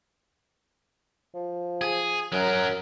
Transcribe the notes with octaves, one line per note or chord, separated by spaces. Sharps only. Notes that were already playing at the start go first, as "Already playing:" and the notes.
F3
G#4
F#2 F#3 A#4